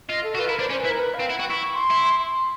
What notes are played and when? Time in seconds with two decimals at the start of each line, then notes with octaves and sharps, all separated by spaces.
0.09 F4 D#5
0.24 A4
0.35 F#4
0.39 F4 B4
0.49 E4 A#4
0.59 D4 C5
0.70 C#4 C5
0.79 B4
0.84 E4
0.89 A#4
0.99 B4
1.14 F5
1.19 C4
1.30 E4 F#5
1.39 F#4 G5
1.49 E4 C#6
1.60 C#6
1.75 C6
1.90 E4
2.19 C6